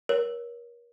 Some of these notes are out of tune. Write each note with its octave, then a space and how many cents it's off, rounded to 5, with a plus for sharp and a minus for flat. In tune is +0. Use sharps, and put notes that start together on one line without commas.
A#4 +35 C#5 +10